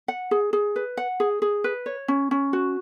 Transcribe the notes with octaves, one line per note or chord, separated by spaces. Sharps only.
F#5
G#4
G#4
B4
F#5
G#4
G#4
B4
C#5
C#4
C#4
F#4